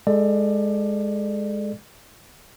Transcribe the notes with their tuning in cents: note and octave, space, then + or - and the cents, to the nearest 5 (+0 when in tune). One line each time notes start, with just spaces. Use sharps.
G#3 +0 A4 +0 D5 +25